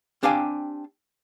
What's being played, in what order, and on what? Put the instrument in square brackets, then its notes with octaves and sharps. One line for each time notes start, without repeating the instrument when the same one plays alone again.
[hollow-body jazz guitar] C4 D4 G4 F5 G5 G#5